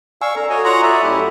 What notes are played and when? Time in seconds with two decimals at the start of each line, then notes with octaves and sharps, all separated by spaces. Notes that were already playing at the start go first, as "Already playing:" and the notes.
0.22 D5 F5 G#5 C#6 E6
0.36 A4 A#5
0.50 F#4 C#5 D#5 G#5
0.65 F4 C#5 F#5 A#5 C6
0.83 A4 D5 E5
1.02 F#2 A3 E4 G4